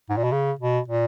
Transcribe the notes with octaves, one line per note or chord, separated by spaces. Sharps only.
G#2
A#2
B2
C#3
B2
A#2